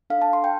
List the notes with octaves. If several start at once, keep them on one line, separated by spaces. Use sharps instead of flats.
D4 A4 F5
A5
C6
G5